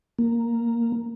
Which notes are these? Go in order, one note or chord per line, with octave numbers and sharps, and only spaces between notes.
A#3